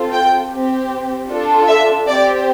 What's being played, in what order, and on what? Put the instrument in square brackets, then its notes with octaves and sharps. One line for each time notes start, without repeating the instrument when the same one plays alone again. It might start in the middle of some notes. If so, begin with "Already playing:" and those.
Already playing: [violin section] C4 F4 A4
G5
C4 G4
D4 F4 A4
E5
C4 G4 D5